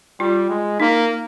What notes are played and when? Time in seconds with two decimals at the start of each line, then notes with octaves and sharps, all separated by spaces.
0.19 G3 F4
0.50 G#3
0.80 A#3 D#4